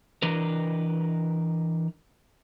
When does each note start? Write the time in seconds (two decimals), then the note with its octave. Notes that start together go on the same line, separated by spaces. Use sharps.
0.22 E3 D4 A#4 B4